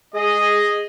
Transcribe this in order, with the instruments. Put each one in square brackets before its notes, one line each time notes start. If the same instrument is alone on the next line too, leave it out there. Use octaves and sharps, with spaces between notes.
[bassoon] G#3 [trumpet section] G#4 D#5